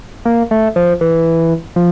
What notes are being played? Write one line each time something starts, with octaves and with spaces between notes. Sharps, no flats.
A#3
A3
F3
E3
F3